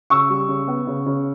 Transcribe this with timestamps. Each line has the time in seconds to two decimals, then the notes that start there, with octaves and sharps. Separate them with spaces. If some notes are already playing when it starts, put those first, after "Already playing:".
0.10 C#3 C#6 E6
0.30 G3
0.49 C#3
0.68 B3
0.87 C#3
1.06 C#3